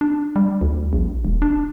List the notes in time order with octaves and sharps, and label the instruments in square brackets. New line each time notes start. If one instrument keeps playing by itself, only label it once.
[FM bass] D4
G3
D2
A#1
E1
D4